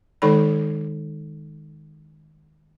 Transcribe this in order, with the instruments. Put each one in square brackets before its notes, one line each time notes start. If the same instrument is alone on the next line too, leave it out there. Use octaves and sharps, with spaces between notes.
[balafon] D#3 G#3 D#4 A4 D5 B5